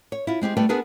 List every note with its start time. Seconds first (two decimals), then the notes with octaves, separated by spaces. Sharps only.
0.12 C#5
0.27 E4 F4
0.41 G#3 C4 G4 G#4
0.57 G3 A3 B3 B4 G5
0.69 B3 D4 G#4 A#4 B4